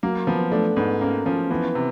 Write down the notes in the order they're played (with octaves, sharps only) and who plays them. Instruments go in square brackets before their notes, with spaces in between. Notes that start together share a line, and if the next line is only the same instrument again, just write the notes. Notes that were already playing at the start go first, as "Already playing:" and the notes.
[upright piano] F#3 [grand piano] A#3
[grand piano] F3 [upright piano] B3
[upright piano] A3 [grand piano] D4
[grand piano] G#2 [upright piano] B3
[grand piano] A#3 [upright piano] C#4
[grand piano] F3 [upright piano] C#4
[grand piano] E3 [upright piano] B3
[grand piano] C3